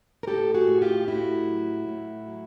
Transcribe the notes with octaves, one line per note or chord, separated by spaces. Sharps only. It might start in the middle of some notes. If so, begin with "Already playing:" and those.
A#4
A2 G4 A4
F#4 G#4
A2
F4 G4
A2 E4 F#4
F#3
A2
F#3